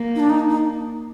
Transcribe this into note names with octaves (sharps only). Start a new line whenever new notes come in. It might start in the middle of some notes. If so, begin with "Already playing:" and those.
Already playing: A#3
D#4
D4
D#4
D#4